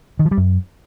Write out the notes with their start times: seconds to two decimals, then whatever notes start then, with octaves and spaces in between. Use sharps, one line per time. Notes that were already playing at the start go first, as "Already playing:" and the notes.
0.19 D#3
0.25 F3
0.31 G3
0.37 F#2